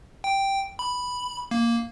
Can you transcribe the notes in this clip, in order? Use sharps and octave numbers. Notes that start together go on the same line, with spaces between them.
G5
B5
A#3